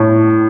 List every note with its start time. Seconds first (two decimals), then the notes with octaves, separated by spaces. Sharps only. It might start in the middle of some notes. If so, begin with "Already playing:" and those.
Already playing: A2